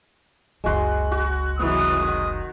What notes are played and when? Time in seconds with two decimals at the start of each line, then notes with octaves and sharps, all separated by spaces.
0.64 F#1 C#2 G#3 F#4 C6
1.12 F#4
1.58 C3 E3 F#3 G#3 D#6
2.04 D#3